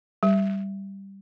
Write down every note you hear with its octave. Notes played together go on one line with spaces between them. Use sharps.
G3